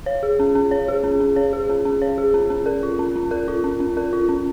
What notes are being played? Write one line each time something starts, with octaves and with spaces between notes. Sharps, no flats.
C#5
G#4
C#4
C#4
C#5
G#4
C#4
C#4
C#5
G#4
C#4
C#4
C#5
G#4
C#4
C#4
A#4
F4
C#4
C#4
A#4
F4
C#4
C#4
A#4
F4
C#4